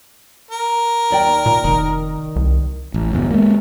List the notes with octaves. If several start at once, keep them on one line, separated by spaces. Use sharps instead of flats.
A#4
D#2 D5 G5
A#2
F1 D#3
C2
A1
G1 E2 G2 B2
G#3 A#3